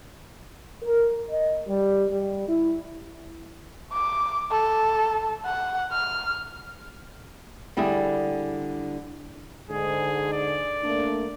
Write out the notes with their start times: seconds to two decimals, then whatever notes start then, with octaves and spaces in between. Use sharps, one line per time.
0.82 A#4
1.30 D#5
1.67 G3
2.10 G3
2.49 E4
3.92 D6
4.51 A4
5.45 F#5
5.92 F6
7.77 D3 G3 E4 G#4
9.70 G#2 D3 G#4
10.33 D5
10.83 A3 A#3 D4